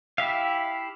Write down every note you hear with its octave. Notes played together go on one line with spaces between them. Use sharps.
E4 G4 E5 F5